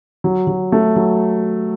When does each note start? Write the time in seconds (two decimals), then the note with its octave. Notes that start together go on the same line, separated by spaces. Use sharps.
0.24 F#3
0.47 F#3
0.72 A3
0.96 F#3